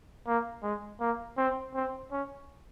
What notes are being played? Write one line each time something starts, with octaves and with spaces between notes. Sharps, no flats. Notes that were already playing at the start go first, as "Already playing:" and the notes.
A#3
G#3
A#3
C4
C4
C#4